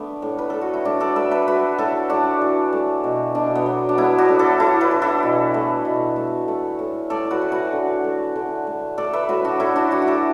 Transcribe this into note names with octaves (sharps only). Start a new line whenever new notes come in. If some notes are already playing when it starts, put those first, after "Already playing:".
Already playing: A3 B3 D4
A2
B4
A3 A4
F#4
E4
A2 D4
A4 D5
A3 B4 E5
B4 E5
A3 F#4 B4
A2 E4 A4
A2 D4 F#4
E3
A3
B2
B2 D4
B3
F#3
D4
A3 B3 E4
D4 F#4
A2
E4 A4
A2 E4 A4
F#4 B4
E3
E4 A4
B2
A3
B2
A3
A3
A2
A2 A4 D5
F#4 B4
E3
F#4 B4
D3
A3
D3
A3
A3 A4 D5
B4 E5
A2 F#4 B4
D4 F#4
A2 E4 A4
D4 F#4
E3 D4 F#4
F#4
E4 A4